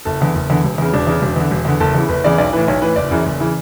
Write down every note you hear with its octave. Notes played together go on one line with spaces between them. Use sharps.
F#1 A4
E2 D3
F#1
E2 D3
E1
E2 C#3
E1 D4
E2 C#3
E1
E2 D3
E1
E2 D3
F#1 A4
E2 C#3 E3
F#1 B4
E2 C#3 E3 D5
B1 D5
A2 E3 B4
B1 C#5
A2 E3 B4
F#1 D5
F#2 C#3 E3
F#1
C#3 E3